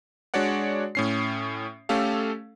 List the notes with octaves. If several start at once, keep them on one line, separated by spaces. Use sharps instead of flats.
G#3 D4 F#4 C#5 D5 F#5
A2 C#4 C7
A3 C#4 G4 A4 F5